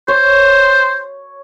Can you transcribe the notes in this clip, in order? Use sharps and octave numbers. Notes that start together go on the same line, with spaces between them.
C5 C#5